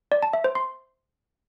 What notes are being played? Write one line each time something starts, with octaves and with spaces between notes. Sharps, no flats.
D5
A5
E5
C5
C6